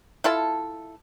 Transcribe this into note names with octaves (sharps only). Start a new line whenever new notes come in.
E4 F4 A4 A5